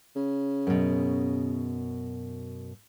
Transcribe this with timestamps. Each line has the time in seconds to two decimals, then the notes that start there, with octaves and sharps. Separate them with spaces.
0.16 C#3
0.67 F#2 B2